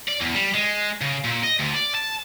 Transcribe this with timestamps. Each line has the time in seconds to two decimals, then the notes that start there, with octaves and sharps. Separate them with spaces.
0.08 D5
0.20 E2
0.35 G3
0.54 G#3
1.01 C#3
1.24 A#2
1.43 D#5
1.59 D2
1.74 D5
1.95 A5